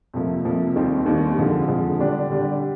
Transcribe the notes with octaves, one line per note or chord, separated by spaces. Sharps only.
F2 C3 F3 A#3
F2 C3 F3 A#3
D#2 D#3 G3 C4 G4
D#2 D#3 G3 C4 G4
F2 D3 F3 G#3
F2 D3 F3 G#3
D3 G3 D4 G4
D3 G3 D4 G4